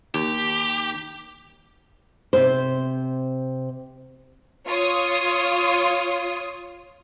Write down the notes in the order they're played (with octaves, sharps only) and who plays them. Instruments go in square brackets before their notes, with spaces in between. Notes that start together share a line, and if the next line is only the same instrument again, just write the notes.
[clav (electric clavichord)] D#2 [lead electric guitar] G4
[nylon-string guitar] C3 C5
[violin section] F4 C#5 D#6